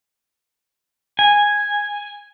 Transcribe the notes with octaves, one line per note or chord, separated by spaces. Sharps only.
G#5